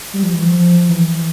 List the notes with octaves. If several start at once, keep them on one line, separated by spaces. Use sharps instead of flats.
G3
F3
E3
F3
E3